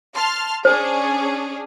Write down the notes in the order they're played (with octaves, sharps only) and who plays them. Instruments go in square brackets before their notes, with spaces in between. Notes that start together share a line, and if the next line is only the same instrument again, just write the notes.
[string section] A5 C6 F6
[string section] C#4 D4 G#4 [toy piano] C5